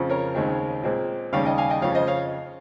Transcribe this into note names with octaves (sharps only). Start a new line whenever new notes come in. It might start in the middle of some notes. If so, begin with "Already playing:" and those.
Already playing: F2 C#3 F3 C4
A#4 C#5
D#2 C#3 G#3 C4
A#2 G#3 C4
D#2 C#3 G3 C#5 F5
D#5 G5
F5 G#5
D#5 G5
F2 C#3 F3 C#5 F5
C5 D#5
C#5 F5